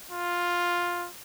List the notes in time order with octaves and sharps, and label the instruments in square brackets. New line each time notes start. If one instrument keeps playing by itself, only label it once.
[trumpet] F4